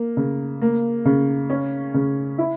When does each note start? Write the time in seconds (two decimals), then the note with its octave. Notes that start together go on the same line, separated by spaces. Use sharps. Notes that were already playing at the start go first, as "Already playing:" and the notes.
Already playing: A#3
0.17 C#3
0.61 A#3
1.05 C#3
1.50 C#4
1.94 C#3
2.38 E4